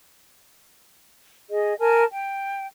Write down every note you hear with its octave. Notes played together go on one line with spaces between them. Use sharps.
G#4 D#5
A#4 G#5 A5
G5